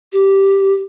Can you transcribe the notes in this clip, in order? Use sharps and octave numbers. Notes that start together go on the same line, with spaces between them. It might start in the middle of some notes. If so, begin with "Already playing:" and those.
G4